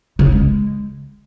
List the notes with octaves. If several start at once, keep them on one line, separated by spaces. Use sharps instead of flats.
C#3
F3
G#3